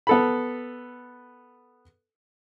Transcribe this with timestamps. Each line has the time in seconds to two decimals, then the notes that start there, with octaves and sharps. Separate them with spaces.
0.07 B3 A4 B5